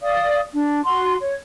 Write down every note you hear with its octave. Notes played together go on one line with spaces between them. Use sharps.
D5 F5 D#6
D4
F#4 C6
C#5